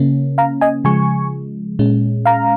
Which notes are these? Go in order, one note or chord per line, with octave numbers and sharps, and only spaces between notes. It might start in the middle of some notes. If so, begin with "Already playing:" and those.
Already playing: C#3 A#3 C#4
F5 A#5
D#5 G#5
C#3 F3 G#3 G#5 C#6
A#2 G#3 C#4
F5 A#5